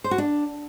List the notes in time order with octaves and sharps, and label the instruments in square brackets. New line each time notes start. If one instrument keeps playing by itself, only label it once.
[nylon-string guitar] C5
F#4
D4